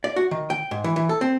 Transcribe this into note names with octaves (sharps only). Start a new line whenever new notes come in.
D5
F#4
D#3
G5
G#2
E3
E3
A4
C4